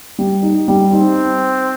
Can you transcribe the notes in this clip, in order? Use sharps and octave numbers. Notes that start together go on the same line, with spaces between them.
G3
D#4
G3
C4 D#4